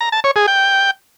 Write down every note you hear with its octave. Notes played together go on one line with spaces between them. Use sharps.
A#5
A5
C#5
G#4
G5